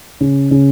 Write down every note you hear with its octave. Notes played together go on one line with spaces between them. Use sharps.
C#3
C#3